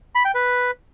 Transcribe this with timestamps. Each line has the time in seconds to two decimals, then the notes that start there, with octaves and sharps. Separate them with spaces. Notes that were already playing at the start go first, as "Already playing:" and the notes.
0.15 B5
0.25 G5
0.35 B4